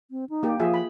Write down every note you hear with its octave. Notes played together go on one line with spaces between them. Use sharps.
C4
D#4
A#3 G4
F3 F4 G#4 E5
B5